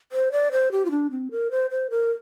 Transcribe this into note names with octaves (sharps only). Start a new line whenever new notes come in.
C5
D5
C5
G4
F4
D4
C4
A#4
C5
C5
A#4